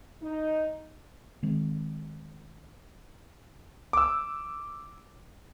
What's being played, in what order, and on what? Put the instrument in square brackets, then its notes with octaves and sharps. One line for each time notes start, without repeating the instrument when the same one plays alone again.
[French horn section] D#4
[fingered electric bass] D#3 G#3 C4
[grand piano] D6 E6